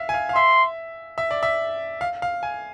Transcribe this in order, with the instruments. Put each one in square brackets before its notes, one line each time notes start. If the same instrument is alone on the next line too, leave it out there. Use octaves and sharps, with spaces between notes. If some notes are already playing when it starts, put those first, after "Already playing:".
Already playing: [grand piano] E5 F5
G#5
F5
F5
[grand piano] E5 [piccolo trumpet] C6
[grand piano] E5
D5
E5
F5
F5
G#5